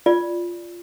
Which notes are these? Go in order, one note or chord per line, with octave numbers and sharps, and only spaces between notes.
F4 D5